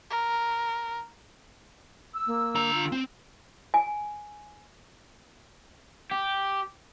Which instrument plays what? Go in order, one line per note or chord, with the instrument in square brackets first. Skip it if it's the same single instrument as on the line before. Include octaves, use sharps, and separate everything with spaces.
[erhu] A#4
[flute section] E6
[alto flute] A#3
[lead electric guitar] D3 A#5
[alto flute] F4
[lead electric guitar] C4
[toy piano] G#5
[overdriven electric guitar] G4